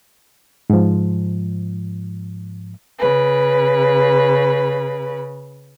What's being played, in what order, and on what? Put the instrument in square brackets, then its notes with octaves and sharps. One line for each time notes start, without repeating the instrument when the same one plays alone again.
[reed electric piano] G#2 F3
[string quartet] C#3 B4